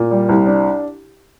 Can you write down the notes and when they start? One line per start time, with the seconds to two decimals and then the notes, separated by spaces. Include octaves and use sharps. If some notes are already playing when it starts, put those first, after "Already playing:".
Already playing: A#2
0.11 G3
0.29 C2
0.47 D4